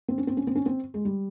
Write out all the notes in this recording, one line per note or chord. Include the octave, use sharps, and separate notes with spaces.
C4
C#4
C4
C#4
C4
C#4
C4
G#3
G3